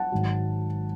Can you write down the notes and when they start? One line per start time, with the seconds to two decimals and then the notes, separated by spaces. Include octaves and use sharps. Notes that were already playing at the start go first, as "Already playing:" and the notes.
Already playing: F#5 A5
0.12 G#1 G#2 F#3